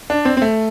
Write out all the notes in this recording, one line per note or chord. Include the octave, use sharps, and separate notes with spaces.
D4
C4
C4
A3